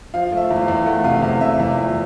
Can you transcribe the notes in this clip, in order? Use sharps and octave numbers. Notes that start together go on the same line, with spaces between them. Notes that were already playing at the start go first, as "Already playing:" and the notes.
F3 F5
A3
E5
E2
F5
E2
A3 F#5
C3 F5
E2 F5
C3 E5
E2
F3